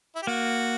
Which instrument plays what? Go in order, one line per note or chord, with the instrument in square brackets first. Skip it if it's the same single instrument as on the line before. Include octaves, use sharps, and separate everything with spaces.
[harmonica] E4
G4
[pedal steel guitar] A#3 [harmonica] F#4